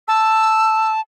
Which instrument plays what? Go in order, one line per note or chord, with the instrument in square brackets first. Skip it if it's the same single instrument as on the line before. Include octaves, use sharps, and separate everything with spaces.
[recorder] A5 [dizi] E6